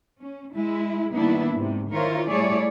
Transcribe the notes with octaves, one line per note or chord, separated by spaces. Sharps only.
C#4
G#3 E4
D#3 G3 A#3 B3 D4 E4
G#2 C3
D#3 E4 F4 A#4 C5 C#5
G3 A3 E4 G#4 C#5 D5